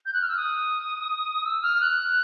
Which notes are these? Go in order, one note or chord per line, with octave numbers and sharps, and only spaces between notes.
G6
F#6
F6
E6
D#6
E6
F6
F#6